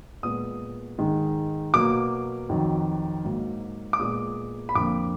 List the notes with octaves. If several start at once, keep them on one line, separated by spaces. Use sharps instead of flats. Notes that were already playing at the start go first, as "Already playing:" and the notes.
A#2 G#3 B3 D#6
G#2 D#3 G#3
B2 F#3 A#3 D6
F2 D#3 F#3
G#2 F#3 A#3
D6
A#2 G#3 B3 D#6
B5
F2 D3 F3 A#3 D6